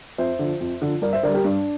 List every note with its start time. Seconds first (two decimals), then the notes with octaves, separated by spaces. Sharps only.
0.18 F2 C5 E5
0.39 D3 F3
0.60 F2
0.82 D3 F3
1.02 G2 A#4 D5
1.13 C5 E5
1.23 D3 A#4 D5
1.27 G3
1.34 G4 A#4
1.44 G2 D4